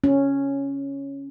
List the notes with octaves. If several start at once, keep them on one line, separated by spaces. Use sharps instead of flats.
C#4